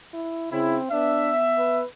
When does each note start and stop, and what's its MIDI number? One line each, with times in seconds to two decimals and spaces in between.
0.13 0.50 64
0.52 0.78 49
0.52 0.87 60
0.52 0.78 64
0.92 1.80 59
0.92 1.31 62
0.92 1.80 76
1.58 1.85 71